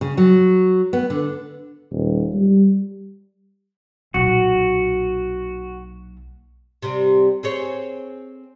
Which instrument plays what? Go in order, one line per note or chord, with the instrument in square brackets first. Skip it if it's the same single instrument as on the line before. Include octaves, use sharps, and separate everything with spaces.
[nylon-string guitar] C#3
F#3
B3
D3
[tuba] D#1
G3
[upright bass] B1 A#2 [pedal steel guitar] F#4
[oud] C3 G3
C4 G#4 C#5